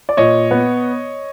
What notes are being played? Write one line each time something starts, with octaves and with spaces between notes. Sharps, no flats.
D5
A#2 C#5 D#5
B3